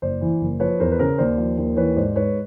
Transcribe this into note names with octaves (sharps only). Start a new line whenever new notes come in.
F#1 C5 D5
E3
F#1
F3 B4 C#5
E2 A#4 C5
B4
C#3 A#4 C5
D#2 C5 D5
F3
D#2
E3 B4 C#5
G#2 C5 D5
G#2 B4 C#5